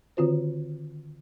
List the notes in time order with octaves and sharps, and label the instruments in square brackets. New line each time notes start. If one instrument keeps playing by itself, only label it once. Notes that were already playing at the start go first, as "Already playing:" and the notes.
[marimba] D3 D#3 C4 F4 F#4 C5